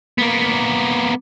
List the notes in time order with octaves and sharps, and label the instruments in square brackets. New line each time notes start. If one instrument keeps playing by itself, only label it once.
[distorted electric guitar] A#3 B3